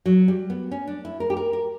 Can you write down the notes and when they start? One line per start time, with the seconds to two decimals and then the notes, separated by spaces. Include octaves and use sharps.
0.06 F#3
0.28 G3
0.50 B3
0.71 C#4
0.87 D4
1.05 E4
1.20 A#4
1.30 G4
1.37 A#4
1.53 A#4